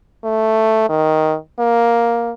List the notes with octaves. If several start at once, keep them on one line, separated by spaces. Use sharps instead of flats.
A3
D#3
A#3